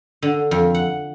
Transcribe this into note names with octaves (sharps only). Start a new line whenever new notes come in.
D3
F2
F#5